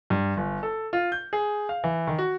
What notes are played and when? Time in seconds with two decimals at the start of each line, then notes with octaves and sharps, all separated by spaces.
0.10 G2
0.37 G1
0.63 A4
0.93 F4
1.12 G6
1.33 G#4
1.69 F5
1.84 E3
2.07 D#3
2.18 F#4